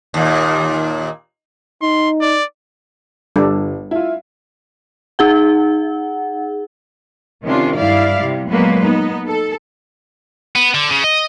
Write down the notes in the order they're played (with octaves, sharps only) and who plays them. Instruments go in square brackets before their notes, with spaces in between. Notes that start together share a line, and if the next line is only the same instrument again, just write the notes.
[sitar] D#2 A#2
[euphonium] D#4 [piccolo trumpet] C6
[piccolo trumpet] D5
[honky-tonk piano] G1 [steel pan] G3 D4 A4
[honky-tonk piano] E4 F4
[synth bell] D#4 G#4 F#5
[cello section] C3 D#3 C#4 D4 F4
G2 E4 D5 F5
C3 G3
A#2 F#3 G#3 A#3 B3 B4
B3 D#4
A4
[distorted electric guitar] B3
D3
C#3
D#5